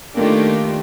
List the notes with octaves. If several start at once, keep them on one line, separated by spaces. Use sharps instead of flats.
D#3 A3 A#3 D4 F4 G4